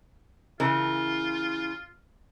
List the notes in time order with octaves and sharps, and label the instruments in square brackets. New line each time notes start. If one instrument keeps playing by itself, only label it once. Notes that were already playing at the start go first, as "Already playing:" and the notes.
[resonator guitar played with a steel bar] C#3 E3 A#4 [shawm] F4